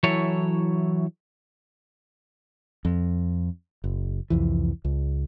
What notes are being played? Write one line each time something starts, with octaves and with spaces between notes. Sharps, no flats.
E3 F#3 E4 A4 C#5
F2
F#1
C2 F2 E3
C#2